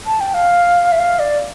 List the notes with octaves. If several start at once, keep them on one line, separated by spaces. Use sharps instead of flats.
A5
G5
F5
E5
F5
D5